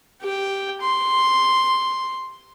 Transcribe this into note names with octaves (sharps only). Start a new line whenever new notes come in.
G4 G5
C6